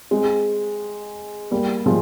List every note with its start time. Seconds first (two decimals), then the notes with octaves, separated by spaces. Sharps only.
0.11 G#3 C4
1.51 G3 A#3
1.86 F3 G#3